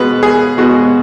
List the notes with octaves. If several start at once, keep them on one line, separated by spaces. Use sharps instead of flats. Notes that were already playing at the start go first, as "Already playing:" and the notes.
Already playing: B2 G#3 B3 B4
G#4
B2 G#3 B3 F#4